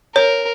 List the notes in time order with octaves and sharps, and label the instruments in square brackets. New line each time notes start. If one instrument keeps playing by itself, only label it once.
[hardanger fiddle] A#4 [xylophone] C#5